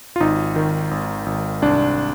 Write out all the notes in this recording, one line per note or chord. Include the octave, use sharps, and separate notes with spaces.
F4
G#1 D#4
D#3
G#1
G#1
C2 D4